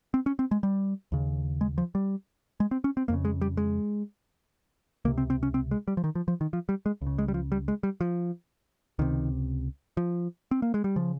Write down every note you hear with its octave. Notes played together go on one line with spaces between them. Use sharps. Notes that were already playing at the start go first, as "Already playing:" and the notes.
C4
C#4
C4
G#3
G3
D#2 C#3
G#3
F3
G3
G#3
C4
C#4
C4
F2 C#3 A#3
G#3
G3
G#3
C#2 C3 A#3
C4
C4
C#4
C4
G#3
G3
F3
D#3
F3
F3
D#3
F3
G3
G#3
C#2
C#3
G#3
G3
F3
G3
G#3
G3
F3
C#2 C3 D#3
F3
C4
A#3
G#3
G3
C#3 F3